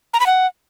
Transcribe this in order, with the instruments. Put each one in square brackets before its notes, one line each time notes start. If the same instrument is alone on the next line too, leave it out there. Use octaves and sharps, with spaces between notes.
[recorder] A#5
B5
F#5